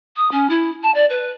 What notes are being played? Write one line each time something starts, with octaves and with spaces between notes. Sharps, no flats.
D#6
C#4
E4
A5
D5
B4